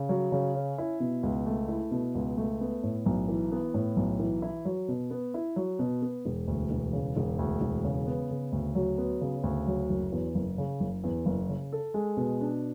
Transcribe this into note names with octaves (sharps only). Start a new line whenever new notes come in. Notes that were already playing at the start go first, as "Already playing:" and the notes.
Already playing: C#3
F#3
C#3
C#4
E4
B2
C#2
A3
E4
B2
C#2
A3
B3
A2
B1
E3
B3
A2
B1
E3
E4
F#3
B2
B3
E4
F#3
B2
B3
E1
D2
E1
C#3
E1
D2
E1
C#3
B3
C#3
D2
F#3
B3
C#3
D2
F#3
F#1
E2
F#1
C#3
F#1
E2
F#1
C#3
A4
G#3
B2
D4